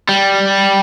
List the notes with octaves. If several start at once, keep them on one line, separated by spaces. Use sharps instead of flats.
G3